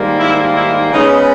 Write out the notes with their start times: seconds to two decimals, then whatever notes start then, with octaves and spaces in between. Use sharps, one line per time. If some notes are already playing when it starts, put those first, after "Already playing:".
Already playing: G#2 D#3 G3 A#3
0.19 E4
0.55 E4
0.92 C#3 G#3 B3 D#4